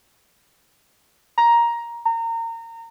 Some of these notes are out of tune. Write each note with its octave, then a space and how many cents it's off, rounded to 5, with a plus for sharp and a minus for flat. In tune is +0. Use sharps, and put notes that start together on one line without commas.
A#5 +10
A#5 -30